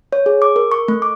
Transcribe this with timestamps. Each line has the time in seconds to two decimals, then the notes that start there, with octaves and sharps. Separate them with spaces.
0.12 C#5
0.26 G#4
0.42 D6
0.56 A#4
0.72 C#6
0.88 A3
1.02 D6